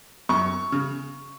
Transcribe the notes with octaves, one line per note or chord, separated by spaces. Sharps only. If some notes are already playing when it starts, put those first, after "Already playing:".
F#2 C#6
C#3